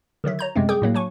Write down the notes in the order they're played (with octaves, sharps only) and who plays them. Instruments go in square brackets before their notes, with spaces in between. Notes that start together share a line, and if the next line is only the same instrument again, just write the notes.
[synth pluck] D3 D#3 F#3 E5
C#5 A#5 G6
F#2 C3 G#3 A3 C4
G3 G#4 G5 D6 G6
A2 F#3 A#3
F#3 D4 G#5 C#6